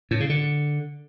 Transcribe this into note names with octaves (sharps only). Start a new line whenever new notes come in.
A2
C#3
D3